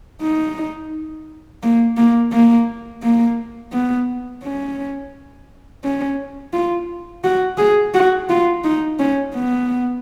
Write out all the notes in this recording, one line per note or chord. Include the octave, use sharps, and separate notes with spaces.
D#4
A#3
A#3
A#3
A#3
B3
C#4
C#4
F4
F#4
G#4
F#4
F4
D#4
C#4
B3